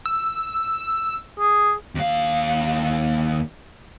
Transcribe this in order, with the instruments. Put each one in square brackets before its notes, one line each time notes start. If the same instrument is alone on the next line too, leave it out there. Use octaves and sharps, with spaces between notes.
[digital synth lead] E6
[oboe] G#4
[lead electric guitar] D#2 F5